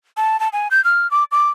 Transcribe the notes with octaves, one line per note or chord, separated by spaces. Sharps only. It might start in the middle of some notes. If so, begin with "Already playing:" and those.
A5
A5
G#5
G6
F6
D6
D6